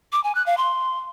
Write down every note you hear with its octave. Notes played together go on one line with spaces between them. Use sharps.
D6
G#5
F#6
F5
C6